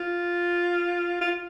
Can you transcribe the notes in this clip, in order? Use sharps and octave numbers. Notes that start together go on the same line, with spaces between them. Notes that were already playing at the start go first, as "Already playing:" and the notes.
Already playing: F4
F4